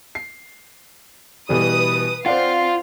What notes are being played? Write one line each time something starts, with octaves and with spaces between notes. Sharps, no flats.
C7
B2 E3 G3 B4 D#6
C4 F4 C5 D5 F5 F#5